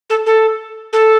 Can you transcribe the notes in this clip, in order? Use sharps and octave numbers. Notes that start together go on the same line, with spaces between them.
A4
A4
A4